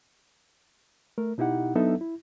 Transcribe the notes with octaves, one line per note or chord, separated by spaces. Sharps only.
A3 A#4
B2 D#4 E4 G4 F#5
F#3 B3 D4 D#4 A4 E5
E4